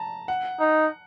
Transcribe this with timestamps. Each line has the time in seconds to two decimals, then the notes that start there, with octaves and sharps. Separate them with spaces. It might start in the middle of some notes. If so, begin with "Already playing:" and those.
Already playing: A5 A#5
0.28 F#5
0.60 D#4